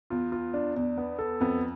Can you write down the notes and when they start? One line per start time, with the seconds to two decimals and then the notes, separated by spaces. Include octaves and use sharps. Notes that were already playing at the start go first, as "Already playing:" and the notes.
0.10 E2 F4
0.32 F4
0.54 D4
0.76 E2 D4
0.98 B3
1.19 A4
1.40 F2 B3